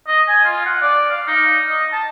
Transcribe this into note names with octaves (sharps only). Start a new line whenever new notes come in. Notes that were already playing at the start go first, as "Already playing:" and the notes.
D#5
G#5
F4
F#5
D5
F5
D#4
D#5
A5